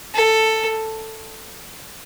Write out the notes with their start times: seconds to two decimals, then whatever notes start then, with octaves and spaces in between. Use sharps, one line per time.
0.14 A4